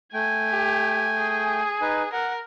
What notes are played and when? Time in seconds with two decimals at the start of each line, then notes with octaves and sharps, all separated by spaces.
0.14 A3 G5 G#5
0.49 G4
1.17 G#4
1.81 D#4 B4
2.13 A#4 F#5